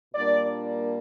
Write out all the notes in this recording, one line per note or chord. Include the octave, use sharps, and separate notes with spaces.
A#2 G3 A#3 D4 D5